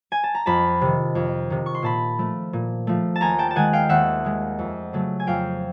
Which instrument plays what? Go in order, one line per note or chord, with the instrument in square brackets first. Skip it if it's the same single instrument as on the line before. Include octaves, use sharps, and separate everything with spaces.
[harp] G#5
A5
A#5
F2 A5 B5
C3 D#3
F2
C3 D#3
C#6
C6
A#2 A5 B5
F3 A3
A#2
F3 A3
A5
D#2 G#5 A#5
G5 A5
A5
D#3 G#3 F#5 G#5
F5 G5
D#2 E5 F#5
D#3 G#3
F2
C#3 F#3 A3
G#5
F2 F5 G5